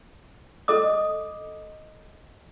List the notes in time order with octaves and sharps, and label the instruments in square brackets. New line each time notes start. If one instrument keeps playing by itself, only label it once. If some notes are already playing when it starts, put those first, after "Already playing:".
[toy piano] A4 D#5 D6 D#6